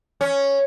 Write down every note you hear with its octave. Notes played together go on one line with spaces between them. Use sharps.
C#4